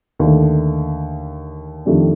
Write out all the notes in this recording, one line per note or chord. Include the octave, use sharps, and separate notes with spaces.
D#2 D3 A3
F2 D#3 A3 D4 G4